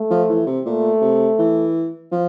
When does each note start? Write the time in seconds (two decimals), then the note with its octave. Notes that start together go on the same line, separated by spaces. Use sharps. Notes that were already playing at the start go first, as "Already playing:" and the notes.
Already playing: A3
0.10 F3
0.29 E3
0.47 C3
0.65 A#2 A3
1.02 C3
1.39 E3
2.12 F3